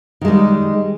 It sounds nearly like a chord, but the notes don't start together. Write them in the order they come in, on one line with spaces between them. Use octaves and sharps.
D#3 G#3 G3